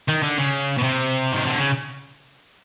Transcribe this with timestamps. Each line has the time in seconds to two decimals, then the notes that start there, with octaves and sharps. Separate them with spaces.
0.09 D#3
0.23 D3
0.38 C#3
0.77 B2
0.83 C3
1.32 D#3
1.46 D3
1.58 C#3